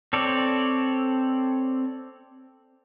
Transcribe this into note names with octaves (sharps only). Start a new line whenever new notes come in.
C4 A4 C#5 D5